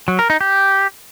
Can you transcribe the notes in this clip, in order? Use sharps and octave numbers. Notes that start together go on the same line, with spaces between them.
F#3
A#4
D#4
G4